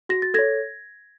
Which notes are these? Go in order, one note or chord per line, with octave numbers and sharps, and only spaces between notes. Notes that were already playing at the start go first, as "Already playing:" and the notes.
F#4 A#6
A6
A4 C#5 G#6 A#6